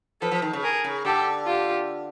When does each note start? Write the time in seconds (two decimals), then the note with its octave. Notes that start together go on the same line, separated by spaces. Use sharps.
0.21 F3 A4 B4
0.31 F3
0.42 D#3
0.53 C#3
0.63 G#4 A#4
0.84 C#3
1.05 D3 G4 A4
1.47 F4 G4